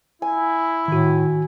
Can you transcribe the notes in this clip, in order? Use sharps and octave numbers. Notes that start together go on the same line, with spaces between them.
E4 G#5
A2 D#3 F#4